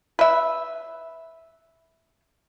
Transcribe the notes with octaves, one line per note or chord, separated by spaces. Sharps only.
B4 E5